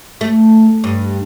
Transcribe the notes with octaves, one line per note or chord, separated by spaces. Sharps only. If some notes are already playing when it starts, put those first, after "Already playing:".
A3
G2